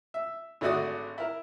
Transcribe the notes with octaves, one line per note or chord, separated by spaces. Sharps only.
E5
G#1 D3 A3 F#4 D5 D#6
E4 A#4